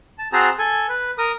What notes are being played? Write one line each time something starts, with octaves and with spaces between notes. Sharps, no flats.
A5
C4 F#4 G#4 C5 A5 A#5
A4 G#5
B4
A#4 D#6